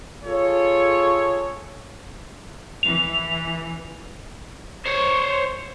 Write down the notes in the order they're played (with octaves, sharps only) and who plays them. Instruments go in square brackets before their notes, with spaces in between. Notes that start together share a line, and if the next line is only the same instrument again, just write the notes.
[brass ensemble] F4 G#4 A4 C#5
[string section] E3 [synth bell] F7
[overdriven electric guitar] C5 C#5